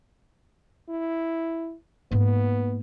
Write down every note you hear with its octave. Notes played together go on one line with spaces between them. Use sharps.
E4
G#2 A#3 B3